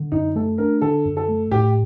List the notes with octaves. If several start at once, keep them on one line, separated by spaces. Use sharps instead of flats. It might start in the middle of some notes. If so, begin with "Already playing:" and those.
Already playing: D3
F#2 D#4
A3 A4
D4 A#4
D3 A4
F#2
A4
A3
A2 G4